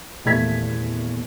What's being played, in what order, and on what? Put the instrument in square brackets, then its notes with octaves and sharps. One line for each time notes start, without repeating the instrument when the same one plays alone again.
[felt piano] D#1 E2 A3 A#3 G#6 B6